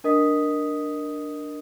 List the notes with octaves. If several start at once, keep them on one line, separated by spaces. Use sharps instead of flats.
D4 A#4 D#5 D#6 B6